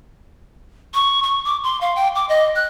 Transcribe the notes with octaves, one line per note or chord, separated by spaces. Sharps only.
C#6
C#6
D6
C6
F5
G5
D6
D#5
F#6